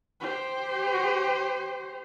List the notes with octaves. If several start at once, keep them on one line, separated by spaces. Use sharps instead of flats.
G4 C5